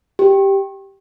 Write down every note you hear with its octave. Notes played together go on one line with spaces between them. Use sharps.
G4